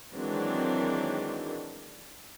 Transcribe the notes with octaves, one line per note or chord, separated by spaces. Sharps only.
D#3 E3 F#3 G#3 C4 D4